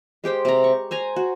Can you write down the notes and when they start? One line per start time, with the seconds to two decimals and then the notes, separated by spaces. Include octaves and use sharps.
0.24 G#3 G4 C5 G5
0.45 C3 A#5
0.64 C#6
0.91 C5 G#5 A#5
1.16 F#4